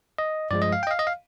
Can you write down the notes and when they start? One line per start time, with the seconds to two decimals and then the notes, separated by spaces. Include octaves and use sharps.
0.18 D#5
0.51 G2 F3 G#3 D5
0.62 D#5
0.72 F5
0.83 G5
0.87 D#5
0.91 F5
0.99 D#5
1.07 F5